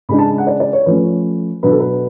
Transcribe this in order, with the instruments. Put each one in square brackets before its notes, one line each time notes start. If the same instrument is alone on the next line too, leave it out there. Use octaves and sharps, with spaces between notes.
[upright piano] C#3 G#3 D4 B5
A5
F#5
D5
D5
C#5
F3 A3 C#4 B4
B2 F#3 B3 D4 B4
A4
B4